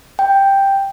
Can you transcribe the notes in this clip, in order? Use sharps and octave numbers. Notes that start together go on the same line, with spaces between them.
G5